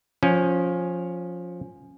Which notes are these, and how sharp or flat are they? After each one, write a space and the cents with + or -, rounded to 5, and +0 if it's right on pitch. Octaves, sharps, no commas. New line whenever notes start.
F3 +15 C#4 +0